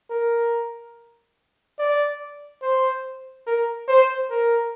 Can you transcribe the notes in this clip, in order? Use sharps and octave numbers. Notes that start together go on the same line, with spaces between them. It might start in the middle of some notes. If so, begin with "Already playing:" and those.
A#4
D5
C5
A#4
C5
A#4